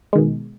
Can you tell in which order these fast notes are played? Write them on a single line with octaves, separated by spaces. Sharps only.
G#3 D#3 B2